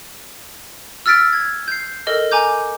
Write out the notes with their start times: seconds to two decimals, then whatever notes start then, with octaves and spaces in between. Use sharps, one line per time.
1.06 E6 F6 A6 B6 D7
1.33 G#6
1.68 G6 C7
2.07 A4 A#4 D#5
2.31 G#5 A#5 D6 G6